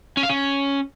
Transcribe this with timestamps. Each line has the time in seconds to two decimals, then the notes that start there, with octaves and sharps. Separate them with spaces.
0.17 C#4
0.23 F5
0.29 C#4